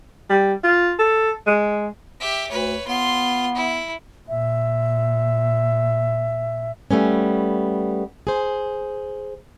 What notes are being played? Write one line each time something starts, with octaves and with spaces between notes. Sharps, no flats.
G3
F4
A4
G#3
G4 E5
D2 B4 C#5
B3 F4 C6
E4
A#2 E5
G3 A3 B3 C#4
G#4 C5